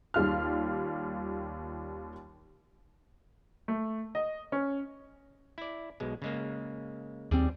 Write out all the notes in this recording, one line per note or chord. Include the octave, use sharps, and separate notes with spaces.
D#2 G3 F4 F6
A3
D#5
C#4
E4 D5
B1 B2 G#3
C#3 G#3 A#3
D#2 G3 C4 G#4 D5